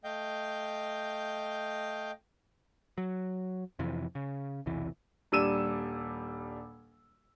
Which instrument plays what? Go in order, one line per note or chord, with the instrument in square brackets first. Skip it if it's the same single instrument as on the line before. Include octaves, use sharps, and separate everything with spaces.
[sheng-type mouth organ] A3 D#5 F5 G5 G6
[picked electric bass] F#3
F2 C3 E3
C#3
B1 E2 C3 E3
[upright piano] D#1 G3 D4 E6 D#7 E7